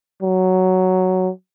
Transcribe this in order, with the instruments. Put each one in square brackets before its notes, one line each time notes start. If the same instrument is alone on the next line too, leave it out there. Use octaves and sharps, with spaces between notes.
[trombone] F#3